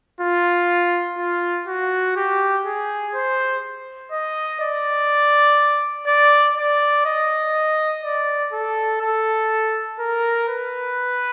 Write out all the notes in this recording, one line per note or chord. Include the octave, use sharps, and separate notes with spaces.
F4
F4
F#4
G4
G#4
C5
D#5
D5
D5
D5
D#5
D5
A4
A4
A#4
B4